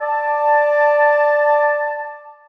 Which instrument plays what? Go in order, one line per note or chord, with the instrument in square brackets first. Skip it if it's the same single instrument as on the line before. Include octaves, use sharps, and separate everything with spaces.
[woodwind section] D5 A5